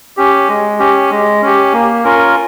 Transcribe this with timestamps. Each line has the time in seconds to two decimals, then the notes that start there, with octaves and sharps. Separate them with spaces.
0.17 C#4 G4
0.48 G#3
0.79 C#4 G4
1.11 G#3
1.42 C#4 G4
1.73 A#3
2.04 C#4 F4 A#4